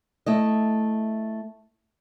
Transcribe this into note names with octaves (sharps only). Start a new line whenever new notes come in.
A3 E4 D#5